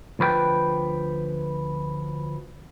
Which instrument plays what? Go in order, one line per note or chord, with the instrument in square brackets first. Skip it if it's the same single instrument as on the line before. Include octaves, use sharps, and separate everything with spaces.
[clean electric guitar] D2 F3 B4 C5 G5